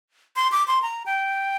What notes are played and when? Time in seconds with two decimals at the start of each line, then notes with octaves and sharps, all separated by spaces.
0.36 C6
0.52 D6
0.68 C6
0.82 A#5
1.06 G5